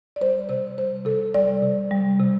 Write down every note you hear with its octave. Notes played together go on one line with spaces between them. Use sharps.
D5
G3 C5
C3 C5
G3 C5
C3 A4
G3 D5
C3
G3
C3